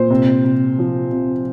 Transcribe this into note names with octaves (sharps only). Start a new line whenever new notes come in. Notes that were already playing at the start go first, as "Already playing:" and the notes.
Already playing: A#2 C5
C3
C3
F3
C3